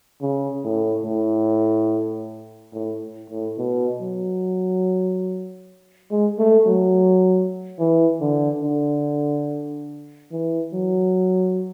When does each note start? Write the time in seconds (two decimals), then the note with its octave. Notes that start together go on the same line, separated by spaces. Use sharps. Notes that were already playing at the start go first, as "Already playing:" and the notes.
0.21 C#3
0.64 A2
1.05 A2
2.74 A2
3.30 A2
3.58 B2
4.00 F#3
6.11 G#3
6.39 A3
6.66 F#3
7.79 E3
8.21 D3
8.63 D3
10.32 E3
10.73 F#3